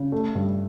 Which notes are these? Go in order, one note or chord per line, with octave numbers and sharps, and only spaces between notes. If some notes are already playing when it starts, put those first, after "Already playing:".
Already playing: C#3
A3
G2